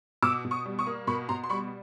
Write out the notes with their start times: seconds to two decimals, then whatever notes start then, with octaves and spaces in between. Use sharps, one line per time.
0.22 B2 D6 E6
0.45 B2
0.51 C#6 D#6
0.65 G3
0.79 C#6 D#6
0.87 A#3
1.07 B2 B5 C#6
1.29 B2 A#5 C6
1.44 C6
1.49 G3 B5 C#6